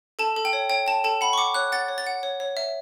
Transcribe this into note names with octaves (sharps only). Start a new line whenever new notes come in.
A4 A5
A4
G5
C#5
C#5 G5
G5 A5
A4 A5
F#5 B5
C#6
F#5 D6
C#5 F#6
F#5 A6
C#5
A6
F#5
C#5
C#5
E5